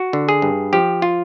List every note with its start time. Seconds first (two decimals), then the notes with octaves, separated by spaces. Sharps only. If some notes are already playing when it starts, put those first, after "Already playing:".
Already playing: F#4
0.13 D3
0.29 G#4
0.42 G2
0.73 F3 G4
1.02 F4